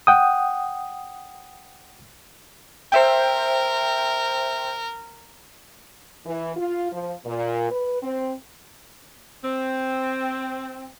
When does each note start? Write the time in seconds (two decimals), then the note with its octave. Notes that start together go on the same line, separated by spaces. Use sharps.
0.07 F#5 G5 D#6
2.92 A#4 C5 E5 G5
6.26 E3
6.57 F4
6.92 F3
7.26 A#2
7.71 B4
8.03 C4
9.43 C4